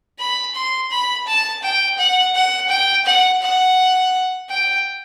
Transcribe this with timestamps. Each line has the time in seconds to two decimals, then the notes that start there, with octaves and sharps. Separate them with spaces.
0.19 B5
0.54 C6
0.91 B5
1.26 A5
1.63 G5
1.98 F#5
2.35 F#5
2.69 G5
3.06 F#5
3.42 F#5
4.49 G5